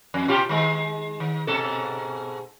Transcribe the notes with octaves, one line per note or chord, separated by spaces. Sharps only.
F2
B2 F4 G4
D#3 G#3
D#3
G#2 B2 A4